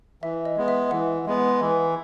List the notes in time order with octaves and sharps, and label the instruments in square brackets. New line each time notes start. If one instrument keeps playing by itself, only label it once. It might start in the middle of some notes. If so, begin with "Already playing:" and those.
[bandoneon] E3 [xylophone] E5
[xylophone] D#5
[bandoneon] G#3 B3
[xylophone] E5
[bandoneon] E3 [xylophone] F#5
[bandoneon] G#3 B3
E3